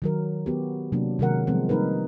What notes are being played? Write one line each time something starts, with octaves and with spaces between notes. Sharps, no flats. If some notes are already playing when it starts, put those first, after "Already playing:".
D#3 F#3 A#4
B3 F#4 G4
C3 F#3 A#3 D4
C3 D#3 F#3 G#3 A#4 F#5
F3 G3 G#3 B3 C4
G3 A#3 D#4 A#4 B4